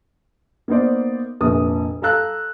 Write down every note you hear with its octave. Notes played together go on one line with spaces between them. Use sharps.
A#3 B3 D#4 C5 D5
F1 A#1 A#3 D#6
A4 F5 A#5 E6 F#6